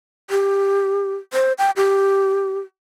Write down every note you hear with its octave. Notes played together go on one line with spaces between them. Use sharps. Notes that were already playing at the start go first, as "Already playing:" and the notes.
G4
C5
G5
G4